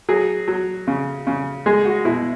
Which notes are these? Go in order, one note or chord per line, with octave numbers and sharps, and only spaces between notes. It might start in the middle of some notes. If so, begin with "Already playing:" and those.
F#3 G#4
F#3
C#3
C#3
G#3 G#4
F#4
B2 E4